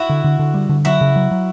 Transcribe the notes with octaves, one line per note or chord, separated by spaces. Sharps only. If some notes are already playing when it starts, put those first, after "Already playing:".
Already playing: E4 F#4
D3
D3
D3
G3
D3
F#3 E4 F#4
C#3
F#3
F#3